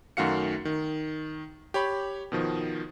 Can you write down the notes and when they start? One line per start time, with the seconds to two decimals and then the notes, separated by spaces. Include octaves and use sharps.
0.17 F#2 D#3 A3 F#4 F5 C#7
0.65 D#3
1.74 G4 C#5 B5
2.32 B2 D#3 F3